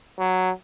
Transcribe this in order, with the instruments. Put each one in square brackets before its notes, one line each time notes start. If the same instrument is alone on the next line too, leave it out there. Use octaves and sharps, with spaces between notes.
[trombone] F#3